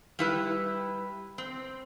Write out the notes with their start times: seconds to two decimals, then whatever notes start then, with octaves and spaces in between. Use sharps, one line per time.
0.19 G3 E4 B4
1.38 C4